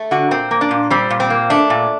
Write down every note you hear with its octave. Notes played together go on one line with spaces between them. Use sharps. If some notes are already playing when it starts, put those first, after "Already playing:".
Already playing: A3
D3 F#4
A#2 C4
A#3
D4
A#2
G3 C4
A#2
C4
A#3
A3 D4
A#2